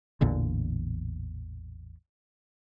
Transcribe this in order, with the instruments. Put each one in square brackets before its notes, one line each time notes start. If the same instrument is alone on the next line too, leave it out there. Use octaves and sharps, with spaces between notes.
[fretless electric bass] A1 E2 A#2 D3